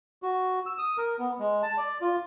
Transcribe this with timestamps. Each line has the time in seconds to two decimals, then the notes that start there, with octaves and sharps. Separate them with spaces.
0.22 F#4
0.66 E6
0.79 D#6
0.97 A#4
1.19 B3
1.39 G#3
1.63 A5
1.78 D5
2.01 F4